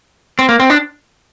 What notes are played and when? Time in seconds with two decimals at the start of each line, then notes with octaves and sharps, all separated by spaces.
0.39 C4
0.49 A#3
0.60 C4
0.70 D4